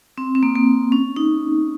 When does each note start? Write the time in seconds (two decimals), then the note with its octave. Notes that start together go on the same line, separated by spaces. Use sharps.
0.18 C4
0.35 C4
0.43 A#3
0.55 A#3
0.92 C#4
1.16 D#4